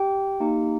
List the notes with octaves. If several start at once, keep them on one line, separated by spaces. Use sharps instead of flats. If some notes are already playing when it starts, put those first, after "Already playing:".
Already playing: G4 G5
A#3 D#4 G4